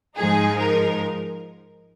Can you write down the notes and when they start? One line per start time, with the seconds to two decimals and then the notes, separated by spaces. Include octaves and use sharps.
0.17 G#2 F3 G#3 D#4 G#4
0.58 A#4